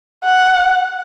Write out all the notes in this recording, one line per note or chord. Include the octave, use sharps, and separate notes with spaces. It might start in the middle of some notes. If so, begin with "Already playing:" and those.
F#5